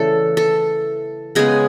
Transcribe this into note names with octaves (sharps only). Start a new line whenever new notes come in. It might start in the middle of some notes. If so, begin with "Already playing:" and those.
Already playing: C#3 E3 A3 C#4 A4 D5
A4
C#3 G#3 B3 G#4